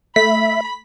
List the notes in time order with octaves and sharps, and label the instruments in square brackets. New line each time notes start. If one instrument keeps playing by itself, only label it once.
[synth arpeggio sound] A3 [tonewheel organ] E5 [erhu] B5 [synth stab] B6